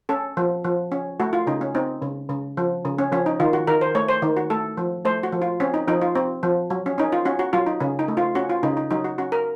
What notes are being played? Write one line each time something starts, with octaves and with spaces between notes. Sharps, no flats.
C#4 A4
F3
F3
C#4
A3 F#4
F4
C#3 D#4
C#4
C4 D#4
C#3
C#3
F3
C#3
C#4
F3 C#4
D#4
D#3 F4
F#4
D#3 A#4
C5
A3 C#5
C5
D#3
F#4
A3 A4
F3
A3 C5
F#4
F3
F4
C4 C#4
D#4
F3 D#4
F4
C4
F3
F#3
C#4
C#4 D#4
F4
C#4 F#4
F#4
F#3 F4
D#4
C#3 C#4
D#4
A3
F4
C#4 F#4
F4
C#3 D#4
D#4
F#3 D#4
F#4
C#4 F#4
A#4